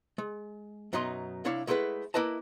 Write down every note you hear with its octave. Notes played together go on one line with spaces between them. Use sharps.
G#3
F#2 B2 F#3 D#4 D#5 C6
C2 D4 E4 C#5 F5
G#3 A3 E4 A4 B4 F#5
A#3 E4 B4 D#5 A5